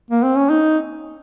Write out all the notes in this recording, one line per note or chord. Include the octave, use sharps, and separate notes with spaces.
A#3
C4
C#4
D#4